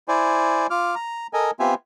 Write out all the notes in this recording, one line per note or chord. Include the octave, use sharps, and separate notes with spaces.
E4 C5 D5 G#5
F4 D6 F6
A#5
A4 A#4 D#5 G#5
B3 C4 F4 G4 E5 G#5